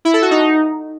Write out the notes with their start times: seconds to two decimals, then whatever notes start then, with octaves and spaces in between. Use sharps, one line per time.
0.05 E4
0.14 A4
0.22 F#4
0.31 D#4